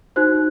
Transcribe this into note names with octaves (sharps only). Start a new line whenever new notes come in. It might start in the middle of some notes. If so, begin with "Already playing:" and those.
D#4 F#4 C5 F#6